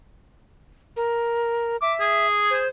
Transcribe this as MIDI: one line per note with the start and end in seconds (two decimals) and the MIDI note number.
0.97 1.77 70
1.82 2.26 76
1.82 1.94 86
2.00 2.62 68
2.50 2.68 72